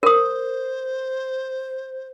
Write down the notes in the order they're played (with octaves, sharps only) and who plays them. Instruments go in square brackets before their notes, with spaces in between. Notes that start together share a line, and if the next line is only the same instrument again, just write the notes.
[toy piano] A#4 D#6 [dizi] C5